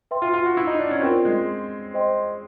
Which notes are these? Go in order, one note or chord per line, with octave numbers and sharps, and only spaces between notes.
B4 E5 G5 C6
F4
F4
F#4
E4
D#4
D4
C#4
C4 F4 A#4 D5 G5
G#3
C5 D#5 G5 C6